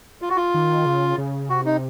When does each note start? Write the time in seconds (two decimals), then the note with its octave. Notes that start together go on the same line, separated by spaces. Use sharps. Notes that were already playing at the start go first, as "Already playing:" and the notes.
0.22 F4
0.30 F#4
0.37 F4
0.54 D#3
0.86 C#3
1.18 C#3
1.49 C3 F#4
1.66 D#4